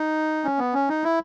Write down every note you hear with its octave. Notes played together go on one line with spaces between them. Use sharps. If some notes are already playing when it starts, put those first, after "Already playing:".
Already playing: D#4
C#4
B3
C#4
D#4
E4